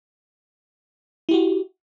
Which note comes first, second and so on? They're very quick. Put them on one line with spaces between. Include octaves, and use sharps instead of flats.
E4 G4 F#4